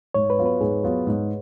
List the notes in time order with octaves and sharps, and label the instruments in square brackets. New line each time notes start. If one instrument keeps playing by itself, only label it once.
[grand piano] G#2 [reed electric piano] C#5
[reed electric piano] B4
[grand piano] F#3 B3 F4
[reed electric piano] B4
[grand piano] G#2 [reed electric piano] G#4
[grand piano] F#3 B3 F4
G#2